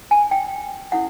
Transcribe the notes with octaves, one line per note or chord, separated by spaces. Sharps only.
G#5
G5
C#4 E4 A4 F#5